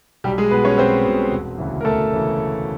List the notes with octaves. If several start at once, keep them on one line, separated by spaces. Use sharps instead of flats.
B1 G3 G4
G#3 G#4
B2 B3 B4
C#4 C#5
B1 C4 C5
B2
E1
D2 C#3 E3
A#4
E1 A3 A4
C#3 E3